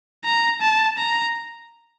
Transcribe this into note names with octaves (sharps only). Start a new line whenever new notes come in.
A#5
A5
A#5